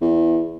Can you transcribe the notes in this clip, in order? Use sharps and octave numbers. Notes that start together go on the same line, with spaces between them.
E2